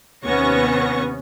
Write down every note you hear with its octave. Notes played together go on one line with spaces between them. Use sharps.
D#2 C3 B3 C#4 C#6 A#6